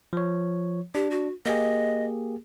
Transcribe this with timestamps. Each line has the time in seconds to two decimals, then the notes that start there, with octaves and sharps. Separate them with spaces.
0.13 F3 C#5
0.95 D4 G4
1.11 F#4
1.46 A#3 G4 G#4 D#5